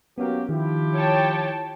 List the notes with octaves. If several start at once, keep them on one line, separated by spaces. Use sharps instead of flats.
F#3 A#3 B3 C#4 G4 F5
D#3 F3 E4 G4
C#5 G5 A5